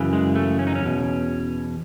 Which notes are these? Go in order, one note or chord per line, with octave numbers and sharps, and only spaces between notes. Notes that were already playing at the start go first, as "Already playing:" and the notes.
Already playing: F#2 C#3 E3
G#3
A3
C#4
D#4
C#4
E2 B2